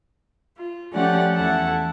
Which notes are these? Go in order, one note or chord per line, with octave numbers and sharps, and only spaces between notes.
F4
F3 A3 C#4 G4 D5 F#5
E2 A3 E4 F#5 A5